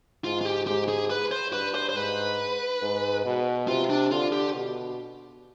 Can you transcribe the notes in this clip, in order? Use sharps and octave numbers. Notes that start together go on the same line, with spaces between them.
G#2 F4
F4
G4
G#2 G4
G#4
B4
C5
G2 B4
C5
C5
G#2 B4
G#2
B2
C3 F4
D4
D3 F4
G4
B2